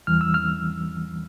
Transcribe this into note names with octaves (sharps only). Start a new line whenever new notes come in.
E2 E3 G3 F6
E6
F6